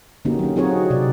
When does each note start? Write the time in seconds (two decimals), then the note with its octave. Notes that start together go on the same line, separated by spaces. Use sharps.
0.25 D3 A#3 C#4 D#4 F#4 G4
0.39 F#3 C#4
0.56 C4 D#4 F4 F#4 G#4 C#5
0.90 C3 D5